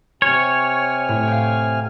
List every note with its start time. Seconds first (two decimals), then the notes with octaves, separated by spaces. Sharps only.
0.22 C3 C#5 G#5 F6
1.08 A2
1.28 F5 G5